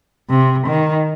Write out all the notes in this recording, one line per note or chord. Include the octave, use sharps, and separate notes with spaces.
C3
D#3